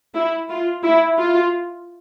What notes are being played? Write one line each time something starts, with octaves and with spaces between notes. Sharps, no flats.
E4
F4
E4
F4